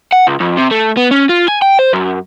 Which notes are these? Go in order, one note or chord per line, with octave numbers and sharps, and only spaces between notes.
F#5
C#2
F2
C3
A3
B3
C#4
F4
G#5
G5
C5
F#2